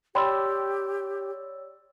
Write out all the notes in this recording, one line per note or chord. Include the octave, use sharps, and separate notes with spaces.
G4 C#5 D5 G5 B5 C6 E6